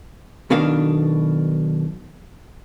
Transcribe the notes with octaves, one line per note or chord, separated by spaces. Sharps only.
B1 B2 D#3 D4 F5